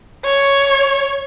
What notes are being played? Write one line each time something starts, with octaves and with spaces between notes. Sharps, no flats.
C#5